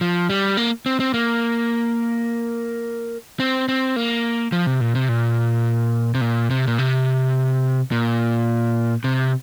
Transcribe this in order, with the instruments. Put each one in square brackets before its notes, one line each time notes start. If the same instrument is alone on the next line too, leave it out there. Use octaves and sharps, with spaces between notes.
[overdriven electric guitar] F3
G3
A#3
C4
C4
A#3
C4
C4
A#3
F3
C3
A#2
C3
A#2
C3
A#2
C3
A#2
C3
A#2
C3